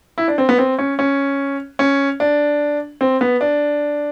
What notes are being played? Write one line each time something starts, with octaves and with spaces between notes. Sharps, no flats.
E4
D4
C4
B3
C4
C#4
C#4
C#4
D4
C4
B3
D4